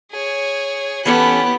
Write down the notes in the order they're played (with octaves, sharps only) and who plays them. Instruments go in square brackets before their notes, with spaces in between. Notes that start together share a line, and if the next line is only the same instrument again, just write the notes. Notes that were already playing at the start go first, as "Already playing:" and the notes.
[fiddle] G#4 C#5
[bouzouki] E3 C#4 A4 [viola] B3 [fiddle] G4 F#6